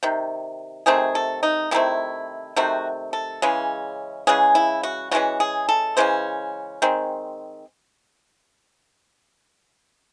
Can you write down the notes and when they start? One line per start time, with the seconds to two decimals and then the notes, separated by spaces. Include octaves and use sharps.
0.03 C3 D#3
0.86 C3 D#3 A3 C4 G#4
1.15 A4
1.43 D#4
1.71 C3 D#3 A3 C4 E4
2.56 C3 D#3 A3 C4 F#4
3.13 A4
3.42 C#3 E3 G#3 C#4
4.27 C#3 E3 G#3 C#4 G#4
4.55 E4
4.83 F#4
5.11 C#3 E3 G#3 C#4 F#4
5.40 G#4
5.69 A4
5.97 C#3 E3 G#3 C#4 C5
6.82 D#3 G#3 C4